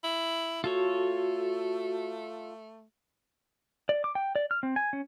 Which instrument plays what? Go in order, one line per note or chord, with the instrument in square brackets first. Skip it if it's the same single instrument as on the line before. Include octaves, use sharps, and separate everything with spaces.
[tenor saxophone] E4
[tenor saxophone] A3 [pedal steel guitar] F4 A4 C#5 [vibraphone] F#4
[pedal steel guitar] D5
D6
G5
D5
F6
C4
G#5
C#4